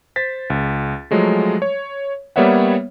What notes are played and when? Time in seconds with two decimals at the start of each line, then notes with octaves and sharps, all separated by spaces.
0.16 C5 A6 B6
0.50 C#2
1.11 F3 F#3 G#3 A3
1.62 C#5
2.36 G3 A#3 B3 C#5 E5 F#5